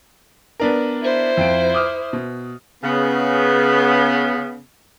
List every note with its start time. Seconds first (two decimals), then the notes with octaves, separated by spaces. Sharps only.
0.60 B3 D4 A#4
1.02 E4 C5
1.37 F2 F4 D7
1.74 D6 D#6 F6
2.13 B2
2.83 C#3 B3